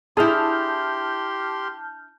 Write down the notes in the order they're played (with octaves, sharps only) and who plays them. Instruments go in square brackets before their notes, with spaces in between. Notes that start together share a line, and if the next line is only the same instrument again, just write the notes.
[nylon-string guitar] D4 E4 [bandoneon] G4 C6 [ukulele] G#4 [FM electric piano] A5 F6 G6